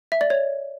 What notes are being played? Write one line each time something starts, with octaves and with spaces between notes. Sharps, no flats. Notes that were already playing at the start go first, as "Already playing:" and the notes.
E5
D5
C#5